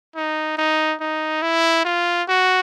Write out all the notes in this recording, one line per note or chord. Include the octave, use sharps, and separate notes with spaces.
D#4
D#4
D#4
E4
F4
F#4